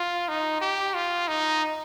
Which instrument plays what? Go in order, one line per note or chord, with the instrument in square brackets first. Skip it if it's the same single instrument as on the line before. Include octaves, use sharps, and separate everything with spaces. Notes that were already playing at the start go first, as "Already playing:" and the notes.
Already playing: [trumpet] F4
D#4
G4
F4
D#4